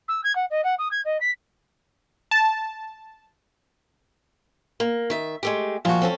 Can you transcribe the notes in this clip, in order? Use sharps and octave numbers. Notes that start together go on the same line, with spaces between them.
E6
G#6
F#5
D#5
F#5
D#6
G#6
D#5
B6
A5
A#3
D#3 E5
G#3 A3 G4
A#2 F3 F#4 E5
C4 C#4 A4